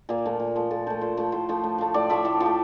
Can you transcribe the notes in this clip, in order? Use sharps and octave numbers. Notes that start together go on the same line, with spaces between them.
A#2 A#3
F3 A3
A#2
F3 A3
A#2 A4
F3 A3 C5
A#2 C5
F3 A3
A2 C5
F3 A3
A2
F3 A3
A2 D5
F3 A3 E5
A2 E5
F3
A3